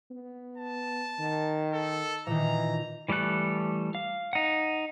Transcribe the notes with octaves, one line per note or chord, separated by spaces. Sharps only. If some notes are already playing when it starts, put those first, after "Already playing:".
B3
A5
D#3
A4
A#2 D#3 E3 A#5
E3 G3 A3 A4 F#6
F5
D#4 F#5